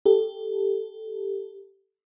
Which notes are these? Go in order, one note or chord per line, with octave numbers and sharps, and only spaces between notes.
G4 A4